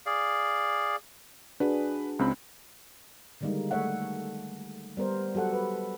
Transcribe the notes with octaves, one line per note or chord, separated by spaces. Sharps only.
G#4 D5 F5
D4 F#4 G#4 B4
C#2 C4 B5
D3 D#3 G3 G#3 A#3 D#4
A3 C#5 E5 F#5
G3 B3 A#4 C5
F#3 G4 A4 F#5
B4